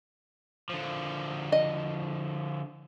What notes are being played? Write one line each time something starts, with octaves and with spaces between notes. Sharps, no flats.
D3 F3
D#5